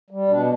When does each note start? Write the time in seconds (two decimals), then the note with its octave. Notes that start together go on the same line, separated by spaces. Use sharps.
0.10 G3
0.28 B2 D4